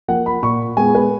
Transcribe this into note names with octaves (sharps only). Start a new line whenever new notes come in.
F3 A#3 F#5
B5
A#2 C#6
G#3 B3 G#5
B4